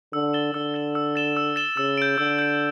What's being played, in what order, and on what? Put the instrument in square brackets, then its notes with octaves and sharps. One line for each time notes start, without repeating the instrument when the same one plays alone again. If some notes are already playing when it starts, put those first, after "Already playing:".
[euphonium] D3 [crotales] E6
[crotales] A6 E7 G7
[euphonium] D3 [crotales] E6
[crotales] A6 E7 G7
E6
A6 E7 G7
E6
A6 E7 G7
[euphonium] C#3 [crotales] E6
[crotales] G6 D7
[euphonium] D3 [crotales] E6
[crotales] G6 D7